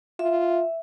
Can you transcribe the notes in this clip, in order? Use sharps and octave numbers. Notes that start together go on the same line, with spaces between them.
F4 E5